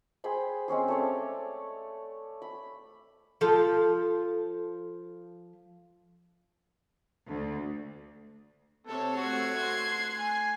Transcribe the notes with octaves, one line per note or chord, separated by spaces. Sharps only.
G#4 C5 G5 B5
G#3 C4 C#4 G#4
A3 C#5 D5
B5
F3 A4
D2
C3 A4 C#5
A3 F#4 G#6 C7
C6 F#6
G#5